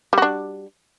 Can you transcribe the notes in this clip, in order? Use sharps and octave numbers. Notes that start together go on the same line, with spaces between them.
G3 D4 F#4